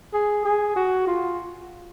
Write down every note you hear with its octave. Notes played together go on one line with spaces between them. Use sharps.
G#4
G#4
F#4
F4